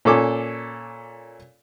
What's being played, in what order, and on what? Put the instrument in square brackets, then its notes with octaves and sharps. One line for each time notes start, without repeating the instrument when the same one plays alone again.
[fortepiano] A#2 C#4 A4 D6